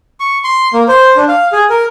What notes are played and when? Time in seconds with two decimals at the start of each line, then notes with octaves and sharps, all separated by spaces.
0.20 C#6
0.44 C6
0.74 A#3
0.88 C5
1.16 D4
1.28 F5
1.53 G#4
1.70 A#4